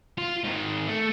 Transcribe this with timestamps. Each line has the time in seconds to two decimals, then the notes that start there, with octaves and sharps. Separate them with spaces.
0.18 F4
0.44 G#2 D#3
0.87 A3